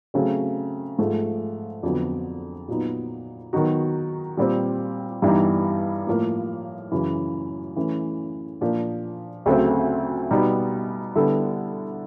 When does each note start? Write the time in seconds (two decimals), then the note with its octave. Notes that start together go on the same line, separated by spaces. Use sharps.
0.14 C#3 F#3 A3 C4
0.99 G#2 F3 A3
1.83 F2 D3 F#3 B3
2.68 A#2 F#3 B3 D#4
3.53 D#3 F#3 B3 D#4 F#4
4.37 A#2 G3 C4
5.22 G2 E3 G3 B3 D#4
6.07 A2 F3 A#3
6.92 F#2 C#3 E3
7.76 E3 A3 C#4
8.61 A#2 F3 A#3 D4
9.46 D2 C#3 F#3 A3 C4
10.31 B2 G3 B3 D#4
11.15 D3 G3 B3 E4 A4